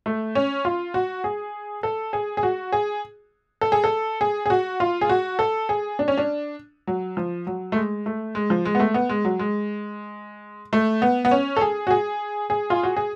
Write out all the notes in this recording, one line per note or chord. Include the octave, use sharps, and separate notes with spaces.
A3
C#4
F4
F#4
G#4
A4
G#4
G#4
F#4
G#4
A4
G#4
A4
G#4
G#4
F#4
F4
G#4
F#4
A4
G#4
D4
C#4
D4
F#3
F3
F#3
A3
G#3
A3
G#3
F3
G#3
B3
A3
B3
G#3
F#3
G#3
A3
B3
B3
C#4
A4
G#4
F#4
G#4
G#4
F4
F#4
G#4